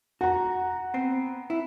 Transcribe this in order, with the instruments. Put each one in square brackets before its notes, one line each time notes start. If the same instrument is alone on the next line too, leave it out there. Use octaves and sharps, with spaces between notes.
[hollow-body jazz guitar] F#4 [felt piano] F#5 A#5
[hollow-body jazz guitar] B3 C4
E4